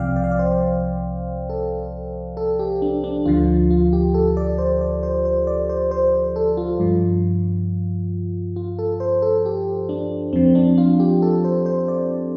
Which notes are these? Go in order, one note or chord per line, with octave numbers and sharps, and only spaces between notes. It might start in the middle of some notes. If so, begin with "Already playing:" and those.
Already playing: C2 C3 F3 D5 F5 G5
D5
F5
D5
C5
A4
A4
G4
D4
D4
D2 D3 F3 F4
F4
G4
A4
D5
C5
D5
C5
C5
D5
C5
C5
A4
F4
G2 F3
F4
A4
C5
A4
G4
D4
F2 F3 C4
D4
F4
G4
A4
C5
C5
D5